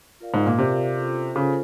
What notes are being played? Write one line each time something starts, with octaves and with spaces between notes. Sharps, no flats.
F4 A#4 D5 F5
G#2
A#2
C3 F4 A#4 D5 F5
C#4 F4 A4 C5
C#3 C#4 F4 A4 C5